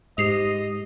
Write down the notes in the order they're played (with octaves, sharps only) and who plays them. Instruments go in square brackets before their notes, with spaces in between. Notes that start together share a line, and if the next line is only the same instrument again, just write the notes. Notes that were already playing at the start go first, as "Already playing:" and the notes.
[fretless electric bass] G#2 [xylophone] G4 C7 F7 [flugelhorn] D#5